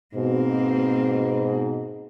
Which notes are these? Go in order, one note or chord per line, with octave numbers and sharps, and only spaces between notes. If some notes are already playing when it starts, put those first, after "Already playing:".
G#2 B2 A#3 C4